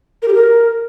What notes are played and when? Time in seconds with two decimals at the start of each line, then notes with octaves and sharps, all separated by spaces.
0.22 A#4
0.28 G4
0.34 A#4